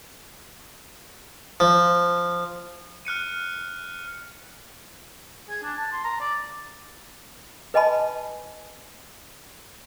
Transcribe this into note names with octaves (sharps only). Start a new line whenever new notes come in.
F3
F6 F#6 C#7 D#7
G#4
D4
A5
C6
A#5
D5
B4 D#5 G#5 A5 B5